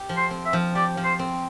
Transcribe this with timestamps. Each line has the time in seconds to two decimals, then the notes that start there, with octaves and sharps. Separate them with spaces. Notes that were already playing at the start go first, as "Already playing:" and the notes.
Already playing: G4
0.09 F3
0.17 C5
0.31 C4
0.46 E5
0.53 F3
0.75 G4 D5
0.97 F3
1.04 C5
1.19 C4